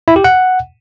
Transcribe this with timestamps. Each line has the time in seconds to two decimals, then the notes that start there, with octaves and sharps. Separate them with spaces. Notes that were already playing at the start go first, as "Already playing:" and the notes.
0.08 E4
0.16 G4
0.24 F#5